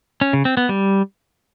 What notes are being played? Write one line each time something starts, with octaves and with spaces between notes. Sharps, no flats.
C#4
C#3
C4
B3
G3